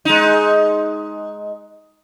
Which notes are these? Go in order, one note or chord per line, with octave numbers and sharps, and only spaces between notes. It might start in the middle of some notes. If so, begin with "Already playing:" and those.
G#3 D#4